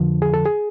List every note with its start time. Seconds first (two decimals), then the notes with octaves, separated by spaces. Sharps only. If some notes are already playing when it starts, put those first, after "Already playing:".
Already playing: F2 D3 F3
0.22 G#4
0.34 A4
0.46 G#4